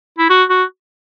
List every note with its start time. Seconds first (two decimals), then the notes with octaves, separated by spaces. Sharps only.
0.18 E4
0.30 F#4
0.50 F#4